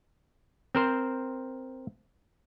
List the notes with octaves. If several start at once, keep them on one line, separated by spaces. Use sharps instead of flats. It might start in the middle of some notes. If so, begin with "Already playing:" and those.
C4 A#4 C5